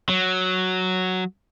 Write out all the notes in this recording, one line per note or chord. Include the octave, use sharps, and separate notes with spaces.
F#3